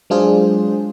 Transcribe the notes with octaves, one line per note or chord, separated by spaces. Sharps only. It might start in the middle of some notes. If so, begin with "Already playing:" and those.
F#3 G#3 D4 F4 G#4 C5